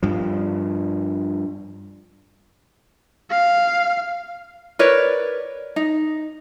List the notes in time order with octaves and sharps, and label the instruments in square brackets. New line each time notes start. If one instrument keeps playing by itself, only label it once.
[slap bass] G2 F3
[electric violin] F5
[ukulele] A#4 B4 C#5 D5
D#4